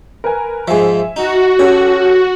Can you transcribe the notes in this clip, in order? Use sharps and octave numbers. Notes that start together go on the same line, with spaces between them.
A#4 B4 G#5
G#2 F3 E5 G#5
D#4 F#4
C#4 G4 A4 C#5